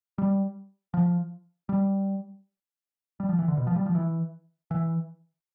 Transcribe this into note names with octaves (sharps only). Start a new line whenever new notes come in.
G3
F3
G3
G3
F3
E3
D3
B2
F3
G3
F3
E3
E3